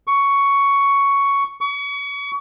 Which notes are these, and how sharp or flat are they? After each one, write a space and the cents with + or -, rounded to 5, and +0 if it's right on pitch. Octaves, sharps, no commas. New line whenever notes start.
C#6 +10
C#6 +35